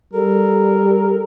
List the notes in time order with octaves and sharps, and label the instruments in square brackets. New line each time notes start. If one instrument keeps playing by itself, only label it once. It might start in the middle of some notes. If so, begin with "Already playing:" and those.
[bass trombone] G3 [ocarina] A4 [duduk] A#4